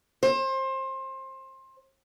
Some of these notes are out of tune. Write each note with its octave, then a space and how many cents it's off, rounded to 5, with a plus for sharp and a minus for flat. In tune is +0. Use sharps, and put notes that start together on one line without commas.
C5 +25